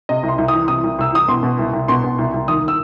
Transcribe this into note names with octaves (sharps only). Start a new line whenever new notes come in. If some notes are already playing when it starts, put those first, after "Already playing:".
C3 D#5
C2
C6
C2
D#6
E3
C3 D#6
C2
C2 E6
E3 D#6
B2 C6
B2
C2
C2
B2 C6
B2
C2
C2
D#2 D#6
E6